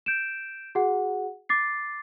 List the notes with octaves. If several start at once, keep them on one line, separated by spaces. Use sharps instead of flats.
G6 D7 E7
F#4 G#4 F#5
D6 A6 C7